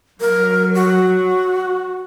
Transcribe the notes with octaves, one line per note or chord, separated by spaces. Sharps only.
F#3 A#4
F#4